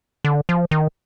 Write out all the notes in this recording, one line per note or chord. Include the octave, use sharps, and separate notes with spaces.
D3
F3
D#3